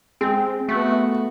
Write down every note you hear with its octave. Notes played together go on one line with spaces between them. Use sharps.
G#3 C4
A3 B3 F#4